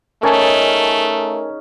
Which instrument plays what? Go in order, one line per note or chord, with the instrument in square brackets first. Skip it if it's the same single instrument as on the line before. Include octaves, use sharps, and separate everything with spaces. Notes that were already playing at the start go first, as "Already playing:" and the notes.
[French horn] A3 [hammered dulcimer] C#4 D#4 G#4 [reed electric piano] A#4 G#5 A5